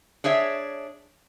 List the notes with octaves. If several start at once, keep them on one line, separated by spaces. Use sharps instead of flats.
D4 G#4 C#5 E5